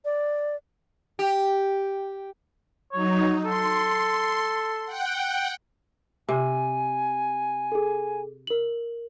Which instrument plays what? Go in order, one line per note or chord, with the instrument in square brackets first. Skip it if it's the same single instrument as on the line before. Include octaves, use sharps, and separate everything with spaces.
[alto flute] D5
[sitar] G4
[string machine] F#3 D#4 [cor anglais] C#5
[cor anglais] A4 [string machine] C6
[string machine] F#5 G5
[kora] C3 [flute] G#5
[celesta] G#4 A4
A#4 F#7